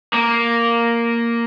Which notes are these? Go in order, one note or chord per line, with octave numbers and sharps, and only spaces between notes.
A#3